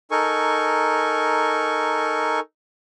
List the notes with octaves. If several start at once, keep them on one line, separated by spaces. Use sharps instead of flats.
D#4 A4 A#4 G#5 C#6